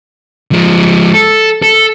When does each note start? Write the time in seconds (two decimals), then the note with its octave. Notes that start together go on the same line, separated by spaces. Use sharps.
0.52 F3 G#3
1.14 A4
1.62 A4